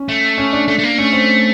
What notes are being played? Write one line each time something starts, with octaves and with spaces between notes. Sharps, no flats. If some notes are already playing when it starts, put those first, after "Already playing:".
Already playing: C#4
A3
C#4
D4
A3
A3
A#3
A3 C#4
C4